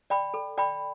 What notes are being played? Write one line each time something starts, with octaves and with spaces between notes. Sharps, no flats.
D5 G5 B5
A4
D5 G5 B5